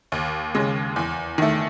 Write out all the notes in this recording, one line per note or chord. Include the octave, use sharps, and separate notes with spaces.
D#2
C#3 G#3
E2
D#3 A3